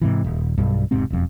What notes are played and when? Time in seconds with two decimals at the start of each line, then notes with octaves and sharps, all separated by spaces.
0.02 G#2 C3 E3
0.24 D#1
0.58 B1 G2
0.91 E1 G#2 C3 C4
1.10 E1 F2